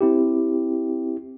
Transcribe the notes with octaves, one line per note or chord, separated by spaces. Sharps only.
C4 E4 G4